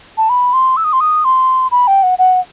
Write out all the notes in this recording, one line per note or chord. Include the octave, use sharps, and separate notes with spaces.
A5
B5
C6
E6
D#6
C6
D#6
C6
B5
G5
F#5
F#5